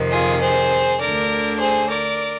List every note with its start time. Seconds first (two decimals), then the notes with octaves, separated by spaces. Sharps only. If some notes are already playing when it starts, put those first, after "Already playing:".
Already playing: F2 C3 D#3
0.11 F4 G#4
0.41 G#4 C5
1.00 D2 D3 A#4 D5
1.60 G#4 C5
1.89 A#4 D5